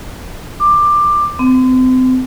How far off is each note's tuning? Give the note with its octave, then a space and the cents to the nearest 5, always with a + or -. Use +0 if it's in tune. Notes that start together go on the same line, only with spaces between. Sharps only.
D6 +15
C4 -35